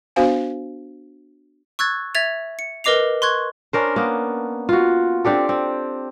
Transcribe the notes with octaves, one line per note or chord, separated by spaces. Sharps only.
B3 D4 F#4 C5 F5 G#5
C#6 E6 F#6 G#6 A6
E5 G#6 A6 F7
C#7
A#4 B4 D#5 D6 C7 F7
C6 C#6 F#6 G#6
C#4 D4 A#4 C5
A#3 B3
F4 F#4
C4 D4 G4 A4
C4